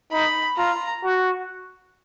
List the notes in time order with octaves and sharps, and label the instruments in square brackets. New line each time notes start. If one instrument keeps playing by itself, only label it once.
[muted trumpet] D#4 [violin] B5
[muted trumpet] F4 [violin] A#5
[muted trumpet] F#4